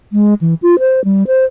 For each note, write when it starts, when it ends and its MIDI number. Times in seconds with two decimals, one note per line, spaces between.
0.13 0.34 56
0.41 0.54 52
0.62 0.79 65
0.79 1.03 72
1.05 1.23 55
1.27 1.45 72